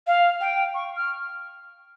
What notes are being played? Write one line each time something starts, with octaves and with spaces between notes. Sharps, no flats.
F5
G5
C#6
F6